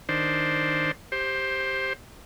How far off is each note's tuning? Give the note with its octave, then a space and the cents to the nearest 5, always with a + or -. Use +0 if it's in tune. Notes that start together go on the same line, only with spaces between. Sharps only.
D#3 +0 D4 +0 C5 +0
G4 +0 C5 +10